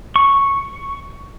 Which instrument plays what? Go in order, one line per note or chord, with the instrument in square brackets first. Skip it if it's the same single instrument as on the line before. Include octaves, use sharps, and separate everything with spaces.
[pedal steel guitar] C#6